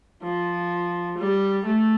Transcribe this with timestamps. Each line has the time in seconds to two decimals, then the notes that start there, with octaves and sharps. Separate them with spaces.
0.23 F3
1.18 G3
1.66 A3